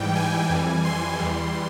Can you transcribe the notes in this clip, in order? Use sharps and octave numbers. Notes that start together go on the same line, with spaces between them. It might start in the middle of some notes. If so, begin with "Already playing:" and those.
Already playing: G#2 E3 G3 G5
G#5
F2 E3 G3
C6
E2 E3 G3